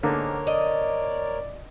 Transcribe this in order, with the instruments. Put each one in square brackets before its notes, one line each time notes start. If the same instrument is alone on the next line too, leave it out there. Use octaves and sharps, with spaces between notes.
[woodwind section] G#2 [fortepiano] D3 A#3 [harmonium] A#4 C#5
[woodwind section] D5 [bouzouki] D#5